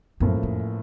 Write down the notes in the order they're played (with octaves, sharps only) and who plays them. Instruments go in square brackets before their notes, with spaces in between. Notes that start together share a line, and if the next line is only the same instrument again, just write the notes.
[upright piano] A1 A2 F3 A#3 [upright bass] F#2
[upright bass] F2